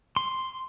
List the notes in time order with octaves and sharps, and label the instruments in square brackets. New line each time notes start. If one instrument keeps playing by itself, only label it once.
[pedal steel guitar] C6